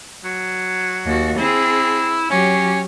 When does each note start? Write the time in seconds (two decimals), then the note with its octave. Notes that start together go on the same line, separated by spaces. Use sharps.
0.24 F#3
1.05 D#2 F#4
1.38 C4 E4 G#4
2.30 F#3 C#4 G4